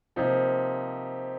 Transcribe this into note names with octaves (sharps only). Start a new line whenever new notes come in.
C3 F3 A#3 D#4